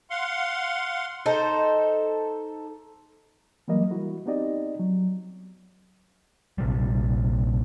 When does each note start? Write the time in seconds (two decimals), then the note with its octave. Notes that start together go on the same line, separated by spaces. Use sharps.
0.10 F5 F#5 C6
1.26 D#4 A4 C5
3.68 E3 F#3 G3 A#3 A#4 D#5
3.91 E4 F#4
4.26 B3 C4 D#4 G4 D5 D#5
4.79 F#3
6.58 A#1 C3 G3